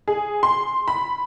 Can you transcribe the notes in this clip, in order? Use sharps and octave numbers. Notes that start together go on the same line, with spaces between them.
G#4
C6
B5